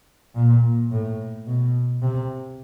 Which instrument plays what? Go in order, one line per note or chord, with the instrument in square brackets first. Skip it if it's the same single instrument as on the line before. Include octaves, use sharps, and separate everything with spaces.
[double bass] A#2
A2
B2
C3